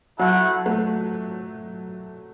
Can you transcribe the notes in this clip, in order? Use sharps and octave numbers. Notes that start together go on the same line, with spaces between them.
F#3 A3 E4 A4 F#5
A3